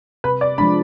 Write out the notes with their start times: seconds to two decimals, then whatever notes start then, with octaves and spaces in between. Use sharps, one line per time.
0.24 C3 B4
0.41 D5
0.58 F3 G#3 D4 B5